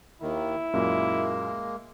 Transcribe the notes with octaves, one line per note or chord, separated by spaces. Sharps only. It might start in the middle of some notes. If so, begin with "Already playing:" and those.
D#2 D#3 E4
F#2 A#2 G#3 A#3